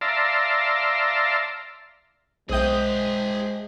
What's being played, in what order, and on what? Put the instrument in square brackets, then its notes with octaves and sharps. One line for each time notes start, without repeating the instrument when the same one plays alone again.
[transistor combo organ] D5 E5 F5 A5 A#5 C6
[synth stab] B1 D#6 G6 [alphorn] G#3 [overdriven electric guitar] G#4 G5 [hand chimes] C5 E5